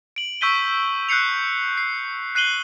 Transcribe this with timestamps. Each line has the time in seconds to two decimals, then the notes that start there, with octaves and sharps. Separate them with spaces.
0.16 D7 F#7
0.41 C#6 E6 G6 B6 D#7 G7
1.09 F#6 G6 C7 C#7 F7
1.78 C7
2.35 F#6 C7 D#7 F#7 G7